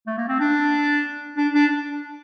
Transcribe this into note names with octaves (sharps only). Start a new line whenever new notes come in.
A3
A#3
C4
D4
D4
D4